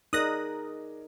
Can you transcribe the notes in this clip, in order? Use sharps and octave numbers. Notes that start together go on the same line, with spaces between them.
D#4 G#4 A#4 D5 D#5 D#6 F#6 A#6